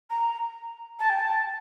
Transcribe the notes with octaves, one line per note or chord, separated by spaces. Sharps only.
A#5
A5
G5
A5